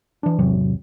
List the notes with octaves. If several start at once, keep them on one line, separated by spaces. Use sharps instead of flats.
E3 D4
G#1 E2 C3 F#3